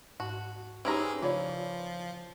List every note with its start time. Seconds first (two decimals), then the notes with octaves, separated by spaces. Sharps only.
0.20 G#2 F#4
0.85 E3 C4 C#4 D#4 G4 G#4 C#5 A#5
1.22 C#3 F3 F4 C#5 D5